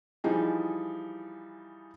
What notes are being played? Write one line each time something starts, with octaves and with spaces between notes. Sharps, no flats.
E3 F3 G3 D#4 G#4